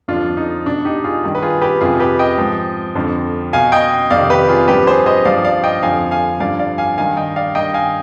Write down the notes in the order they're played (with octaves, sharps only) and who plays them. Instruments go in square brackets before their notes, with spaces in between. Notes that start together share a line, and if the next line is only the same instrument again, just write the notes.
[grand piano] F2 D3 F3 D4 F4
D#4
B2 D4
D#4 G4
F4 G#4
G2 D#3
B4
F4 G#4
G4 B4
F2 C3 F3 F4 G#4
G4 B4
D#5 G5
G#2 F3
F2 D3 F3
B2 F5 G#5
D#5 G5
F2 C3 D#3 D5 F5
G4 B4
F4 G#4
G2 F3 G4 B4
G#4 C5
C5 D#5
G2 F3 D5 F5
D5 F5
D#5 G5
F2 D3 F3 F5 G#5
F5 G#5
G2 D3 F3 D5 F5
D5 F5
F5 G#5
G2 D#3 F5 G#5
D#5 G5
D5 F5
G2 D#3 D#5 G5
F5 G#5